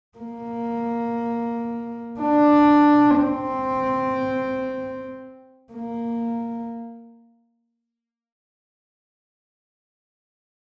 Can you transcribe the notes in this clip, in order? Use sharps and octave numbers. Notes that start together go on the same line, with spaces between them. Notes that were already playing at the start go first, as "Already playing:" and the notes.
A#3
D4
C4
A#3